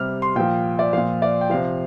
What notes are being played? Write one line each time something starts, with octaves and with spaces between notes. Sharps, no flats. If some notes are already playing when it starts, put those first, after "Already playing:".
Already playing: C3 G3 F6
C6
A#2 F3 G5
D5
A#2 F3 F5
D5
G5
C3 F3 F5